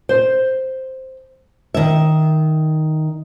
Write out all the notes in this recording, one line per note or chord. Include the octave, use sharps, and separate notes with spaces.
C5
D#3 E5